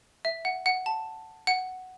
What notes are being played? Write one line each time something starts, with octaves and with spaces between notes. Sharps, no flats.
E5
F#5
F#5
A5
F#5